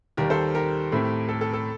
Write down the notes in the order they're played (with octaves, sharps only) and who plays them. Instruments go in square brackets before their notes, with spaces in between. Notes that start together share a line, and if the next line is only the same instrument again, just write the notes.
[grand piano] D#2 D#3 G3 G4 A#4
A4 C5
G4 A#4
A2 A3 C4
A4
A4
A4